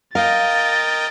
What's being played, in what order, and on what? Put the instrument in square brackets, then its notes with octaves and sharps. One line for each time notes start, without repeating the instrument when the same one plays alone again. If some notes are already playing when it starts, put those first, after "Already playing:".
[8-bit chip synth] A#4 D#5 G5 [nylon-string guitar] F5 [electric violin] A6